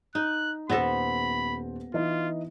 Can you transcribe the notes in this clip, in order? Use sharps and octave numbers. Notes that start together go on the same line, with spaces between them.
D#4 F#6
D#1 B3 A4 C5 B5 A#6
E3 D#4 F4